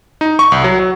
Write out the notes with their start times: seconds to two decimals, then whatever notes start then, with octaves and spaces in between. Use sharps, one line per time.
0.21 D#4
0.39 C#6
0.52 C2
0.64 F#3
0.79 F#3